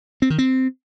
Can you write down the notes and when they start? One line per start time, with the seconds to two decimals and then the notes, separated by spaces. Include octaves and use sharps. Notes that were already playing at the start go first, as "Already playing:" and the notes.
0.22 C4
0.30 D#3
0.38 C4